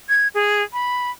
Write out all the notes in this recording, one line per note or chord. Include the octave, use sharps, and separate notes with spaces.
G#6
G#4
B5